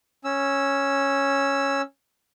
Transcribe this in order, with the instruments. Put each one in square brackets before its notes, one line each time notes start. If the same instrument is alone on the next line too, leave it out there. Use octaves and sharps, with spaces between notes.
[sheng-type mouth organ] C#4 E6